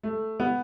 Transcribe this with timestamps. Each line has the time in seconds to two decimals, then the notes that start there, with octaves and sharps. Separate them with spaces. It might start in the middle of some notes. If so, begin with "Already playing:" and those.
0.03 A3
0.40 B3